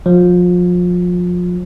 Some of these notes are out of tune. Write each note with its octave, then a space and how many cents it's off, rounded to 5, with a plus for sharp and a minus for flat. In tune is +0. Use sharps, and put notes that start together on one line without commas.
F3 +30